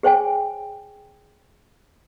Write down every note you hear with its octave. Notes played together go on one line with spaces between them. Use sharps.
G#4 C5 C#5 G5 G#5